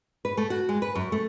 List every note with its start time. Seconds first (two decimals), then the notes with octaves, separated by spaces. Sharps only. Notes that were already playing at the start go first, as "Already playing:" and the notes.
0.25 B4
0.37 A3
0.50 F#4
0.69 G#3
0.82 B4
0.95 F#2
1.12 A3